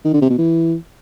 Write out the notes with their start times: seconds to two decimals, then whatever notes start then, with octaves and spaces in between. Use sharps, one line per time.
0.05 D#3
0.13 D3
0.22 C3
0.30 B2
0.38 E3